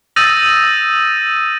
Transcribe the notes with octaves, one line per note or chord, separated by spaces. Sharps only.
D#6 E6 G6 A6 A#6 D#7